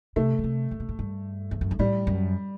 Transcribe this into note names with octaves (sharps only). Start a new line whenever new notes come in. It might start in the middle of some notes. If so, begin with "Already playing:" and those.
C3 A3
D#3
C3
A2
B2
A2
G2
E2
F#2
G2
A2 G3
F#2